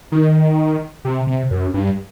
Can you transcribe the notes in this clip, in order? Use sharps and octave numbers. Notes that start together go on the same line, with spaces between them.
D#3
C3
C3
F#2
G2